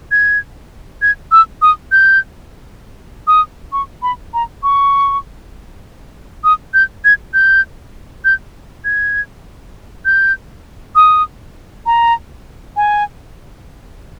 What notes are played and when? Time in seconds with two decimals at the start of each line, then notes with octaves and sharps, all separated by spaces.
0.11 G#6
1.02 G#6
1.32 E6
1.62 D#6
1.92 G6
3.27 D#6
3.73 C#6
4.03 B5
4.34 A#5
4.63 C#6
6.44 D#6
6.74 G6
7.05 G#6
7.34 G6
8.25 G6
8.85 G#6
10.05 G6
10.95 D#6
11.86 A#5
12.77 G#5